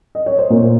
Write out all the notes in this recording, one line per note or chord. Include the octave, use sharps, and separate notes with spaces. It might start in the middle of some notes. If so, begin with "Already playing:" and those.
D#5
C#5
C5
A#2 A#4